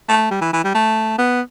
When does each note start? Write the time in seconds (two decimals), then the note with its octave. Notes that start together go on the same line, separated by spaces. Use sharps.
0.09 A3
0.31 G3
0.41 E3
0.53 E3
0.64 G3
0.74 A3
1.18 B3